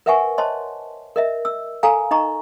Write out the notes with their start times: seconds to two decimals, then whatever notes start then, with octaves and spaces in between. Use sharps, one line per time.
0.06 A#4 B4 E5 F#5 G#5 C#6
0.38 C5 C#5 D#5 A5 C6
1.16 A#4 D#5 E5
1.45 E6
1.83 A4 F5 G#5 A#5
2.11 D#4 D#5 A#5 C#6